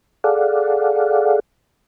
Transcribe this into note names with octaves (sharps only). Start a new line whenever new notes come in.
G#4 A4 D5 F5 F#5